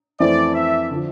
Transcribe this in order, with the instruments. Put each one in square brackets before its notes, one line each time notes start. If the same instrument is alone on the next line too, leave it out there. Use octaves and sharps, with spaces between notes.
[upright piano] F2 E3 A3 C4 E4 [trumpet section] D5
[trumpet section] E5
[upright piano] D3 F3